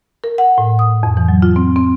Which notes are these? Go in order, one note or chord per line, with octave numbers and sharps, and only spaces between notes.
A#4
F#5
A2
D#6
F2
E3
F#3
F4
C4
C4